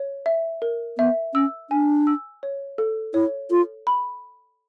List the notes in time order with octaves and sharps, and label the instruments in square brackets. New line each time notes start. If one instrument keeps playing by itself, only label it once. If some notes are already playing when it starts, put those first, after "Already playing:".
Already playing: [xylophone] C#5
E5
A#4
[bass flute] B3 [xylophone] E5
[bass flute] C#4 [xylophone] E6
[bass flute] D4 [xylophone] G#5
[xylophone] E6
C#5
A4
[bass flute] E4 [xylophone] C#5
[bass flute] F4 [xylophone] A4
[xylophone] B5